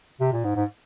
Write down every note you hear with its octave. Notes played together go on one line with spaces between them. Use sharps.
C3
A#2
G#2
G#2